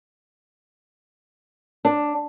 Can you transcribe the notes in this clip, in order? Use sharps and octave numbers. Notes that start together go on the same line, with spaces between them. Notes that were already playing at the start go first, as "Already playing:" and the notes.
D4